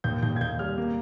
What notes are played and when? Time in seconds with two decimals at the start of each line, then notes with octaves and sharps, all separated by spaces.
0.04 D#2 G6
0.23 D#2 G6
0.36 G#6
0.41 D#2 G6
0.59 G3 F6
0.78 A#3